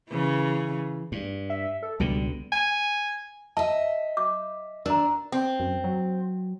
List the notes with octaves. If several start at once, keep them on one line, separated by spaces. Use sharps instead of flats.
C#3 E3
G2
E5
A4
C#2 B2 D3 G3
G#5
D#5 E5 A5
D6
D4 A#4 A#5
C4
F#2
F#3